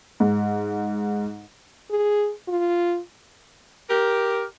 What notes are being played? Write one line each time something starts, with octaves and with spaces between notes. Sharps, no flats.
G#2
G#4
F4
G4 A#4